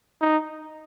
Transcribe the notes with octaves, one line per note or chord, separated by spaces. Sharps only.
D#4